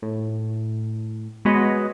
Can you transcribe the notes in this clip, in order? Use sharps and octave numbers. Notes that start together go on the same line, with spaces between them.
A2
G#3 B3 F#4 B4 C#5 D#5